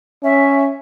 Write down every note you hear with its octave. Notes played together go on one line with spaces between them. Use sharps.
C#4 E5